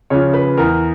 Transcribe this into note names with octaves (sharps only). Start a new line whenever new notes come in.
C#3 F3 C#5
B4
E2 A#4